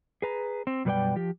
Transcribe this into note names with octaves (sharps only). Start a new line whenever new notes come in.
G#4 B4 A#5
C4
F#2 B2 G3 B4 D5 G5
F3 G4